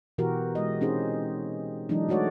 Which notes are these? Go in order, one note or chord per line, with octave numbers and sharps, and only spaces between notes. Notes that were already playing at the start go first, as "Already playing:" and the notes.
B2 E3 F#4 G4 A#4
G#3 D#5
C4 C#4 D#4 G4 G#4 C5
E3 F#3 G#3 D4 D#4
G#3 A3 F#4 C#5 D5